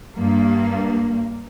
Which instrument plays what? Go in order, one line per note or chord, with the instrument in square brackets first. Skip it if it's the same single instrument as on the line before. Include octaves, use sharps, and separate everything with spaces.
[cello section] G2 A#3